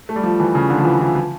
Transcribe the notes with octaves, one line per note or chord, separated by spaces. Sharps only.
A3
G3
F3
E3
C#3
D3
F3
E3
E3
F3